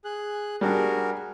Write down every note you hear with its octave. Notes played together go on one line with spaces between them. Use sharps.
G#4 F#6
G3 D4 F#4 G#4 A#4